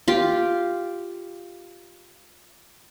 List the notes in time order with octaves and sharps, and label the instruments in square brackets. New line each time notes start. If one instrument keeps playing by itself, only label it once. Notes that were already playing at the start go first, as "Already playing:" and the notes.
[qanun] F4 G4